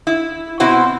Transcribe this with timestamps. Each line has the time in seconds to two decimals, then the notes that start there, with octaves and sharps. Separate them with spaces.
0.07 E4
0.60 B2 C4 E4 F#4